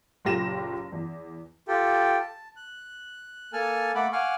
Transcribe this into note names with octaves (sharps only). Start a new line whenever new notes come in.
F#1 A#2 G4 A#6 E7
E2
F4 G4 A4 G5
A5
F#6
A#3 A4 G#5 A5 F6
A3 A#3 A4 F#5 B5 D6
F5 F#5 G#5 C#6 D6 F6